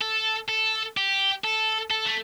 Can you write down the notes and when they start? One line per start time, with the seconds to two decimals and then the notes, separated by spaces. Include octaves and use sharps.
0.02 A4
0.49 A4
0.97 G4
1.44 A4
1.91 A4
2.07 A3